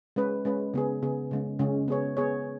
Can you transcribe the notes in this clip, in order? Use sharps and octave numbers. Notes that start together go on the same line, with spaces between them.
G#3 C#4 B4
G#3 C#4 B4
C#3 B3 G#4
C#3 B3 G#4
C#3 G#3 C#4
C#3 G#3 C#4
B3 G#4 C#5
B3 G#4 C#5